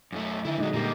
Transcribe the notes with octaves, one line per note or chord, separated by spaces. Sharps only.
F#2 A3
D3 D#3 E4
A#2 F#3 G#3 D#4 D#5
A#2 G3 A#3 G4